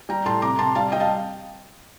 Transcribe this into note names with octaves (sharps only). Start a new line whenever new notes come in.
G3 G5 A#5
A2 A5 C6
C3 A#5 D6
C3 A5 C6
G3 F5 A5
G3 D#5 G5
F5 A5